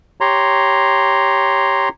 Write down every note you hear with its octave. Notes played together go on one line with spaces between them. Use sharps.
G4 C#5 A#5 C6